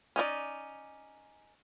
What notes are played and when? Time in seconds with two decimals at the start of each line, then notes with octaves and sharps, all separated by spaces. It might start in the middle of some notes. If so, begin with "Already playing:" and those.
0.16 C#4 D#4 F4 D5